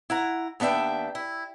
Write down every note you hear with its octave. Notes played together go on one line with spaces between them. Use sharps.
E4 F#5 A#5
D#2 B3 D4 E5 G5
E4